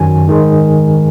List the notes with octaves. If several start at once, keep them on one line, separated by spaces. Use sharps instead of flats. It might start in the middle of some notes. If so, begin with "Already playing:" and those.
Already playing: F#2 D#3 F#3 G#5
G#2 D#3 G#3